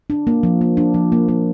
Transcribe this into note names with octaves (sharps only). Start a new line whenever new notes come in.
D4
A#3
F3
A#3
D4
F3
A#3
A#3